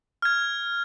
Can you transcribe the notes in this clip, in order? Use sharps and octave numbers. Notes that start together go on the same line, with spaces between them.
F6 G#6